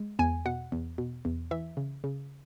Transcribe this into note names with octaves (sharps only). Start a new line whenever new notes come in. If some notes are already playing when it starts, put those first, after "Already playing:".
Already playing: G#3
E2 G#5
B2 F#5
E2
B2
E2
E3 E5
C#3
C#3